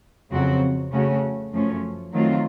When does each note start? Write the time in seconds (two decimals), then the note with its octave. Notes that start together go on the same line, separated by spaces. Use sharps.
0.31 F2 C#3 F#3 C4 F#4
0.92 C#3 A3 C#4 F#4
1.52 F#2 F3 A3 C#4
2.13 D#3 F#3 A3 C4 F4